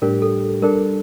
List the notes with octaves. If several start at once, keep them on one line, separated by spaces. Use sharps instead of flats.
A2 G3 D4 G4 A#4
A4
G3 D4 A4 A#4